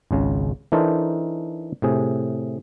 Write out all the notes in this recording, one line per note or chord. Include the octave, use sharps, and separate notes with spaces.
G#1 C#2 C#3
E3 D4 D#4 A4 A#4 C5
A2 C3 G#4